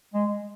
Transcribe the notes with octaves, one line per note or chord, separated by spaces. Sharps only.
G#3